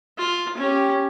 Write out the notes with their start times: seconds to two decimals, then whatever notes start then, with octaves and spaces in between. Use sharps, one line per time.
0.18 F4
0.58 C#4 G4